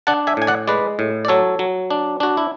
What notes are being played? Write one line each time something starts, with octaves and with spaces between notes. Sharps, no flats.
D4 F#5 A5
E5 G#5
A2 G#5
D5 F#5
G#3 B4 D5
A2
D5
F#3 A4 C#5
F#3
D4
D4 F#4
E4